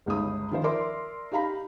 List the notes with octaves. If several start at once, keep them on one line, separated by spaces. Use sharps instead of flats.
G1 C#2 D#4 D#6
D#3 F3 C5
A#4 D5 E5 C6 D6
D#4 G4 F5 A#5 B5